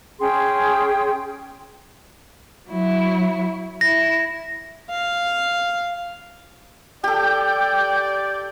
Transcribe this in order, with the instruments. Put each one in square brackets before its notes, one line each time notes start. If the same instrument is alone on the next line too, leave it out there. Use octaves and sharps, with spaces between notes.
[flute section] C#4 G#4 G5 C6
[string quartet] F#3 E4
[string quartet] E4 [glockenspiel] A#6
[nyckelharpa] F5
[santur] G4 A4 [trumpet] D5 [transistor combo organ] G5 [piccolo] G6